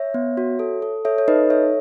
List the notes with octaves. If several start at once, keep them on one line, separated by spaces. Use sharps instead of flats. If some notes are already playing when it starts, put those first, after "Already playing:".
Already playing: C#5 E5
B3
F#4
A4
A4
A4 C#5 E5
C#5
D#4 B4 D#5
A4 C#5 E5